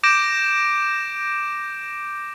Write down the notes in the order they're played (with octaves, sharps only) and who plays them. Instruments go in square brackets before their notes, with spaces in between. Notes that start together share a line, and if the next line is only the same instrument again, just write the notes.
[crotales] D6 G6 A#6 D7 E7